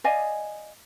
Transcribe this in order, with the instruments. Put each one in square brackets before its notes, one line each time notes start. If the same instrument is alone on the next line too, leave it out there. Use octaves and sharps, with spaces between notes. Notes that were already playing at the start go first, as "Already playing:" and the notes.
[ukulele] D5 D#5 F5 G#5